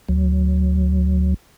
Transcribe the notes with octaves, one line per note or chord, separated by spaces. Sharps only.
D2 F#3